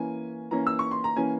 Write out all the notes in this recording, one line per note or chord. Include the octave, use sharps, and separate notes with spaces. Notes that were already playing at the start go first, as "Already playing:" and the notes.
Already playing: E3 A#3 C#4 G#5
E3 A#3 C#4 A#5
E6
C#6
C6
A#5
E3 A#3 C#4 G#5